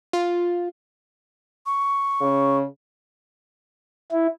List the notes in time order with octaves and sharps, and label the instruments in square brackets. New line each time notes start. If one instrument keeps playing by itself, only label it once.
[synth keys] F4
[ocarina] C#6
[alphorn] C#3
[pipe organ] E4